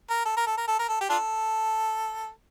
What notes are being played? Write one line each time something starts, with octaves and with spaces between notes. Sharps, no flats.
A#4
A4
A#4
A4
A#4
A4
A#4
A4
G4
D4 F4 A4